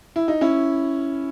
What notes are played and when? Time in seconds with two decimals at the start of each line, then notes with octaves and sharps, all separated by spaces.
0.16 E4
0.28 D#4
0.41 C#4 E4